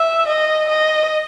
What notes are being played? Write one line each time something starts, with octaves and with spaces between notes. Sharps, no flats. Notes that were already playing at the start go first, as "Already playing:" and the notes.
Already playing: E5
D#5
D#5